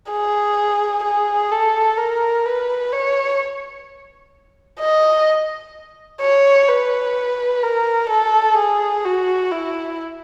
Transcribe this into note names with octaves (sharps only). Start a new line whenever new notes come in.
G#4
G#4
A4
A#4
B4
C#5
D#5
C#5
B4
A#4
A4
G#4
F#4
E4